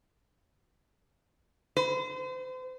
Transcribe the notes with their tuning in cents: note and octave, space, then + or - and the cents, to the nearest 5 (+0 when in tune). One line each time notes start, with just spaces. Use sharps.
C5 -35